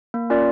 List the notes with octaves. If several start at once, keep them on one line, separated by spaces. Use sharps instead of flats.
A#3
C#4 F4 A#4 D5